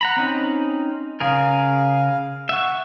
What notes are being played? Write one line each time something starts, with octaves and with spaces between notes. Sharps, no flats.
F#5 A#5 B5
C4 C#4 D#4
C#3 G#4 A#4 F5
E5 F#5 C#6